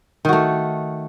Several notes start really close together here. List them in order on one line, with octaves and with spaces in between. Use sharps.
D#3 F#4 A3